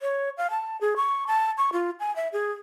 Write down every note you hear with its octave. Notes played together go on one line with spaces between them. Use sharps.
C#5
F5
A5
G#4
C#6
A5
C#6
F4
G#5
E5
G#4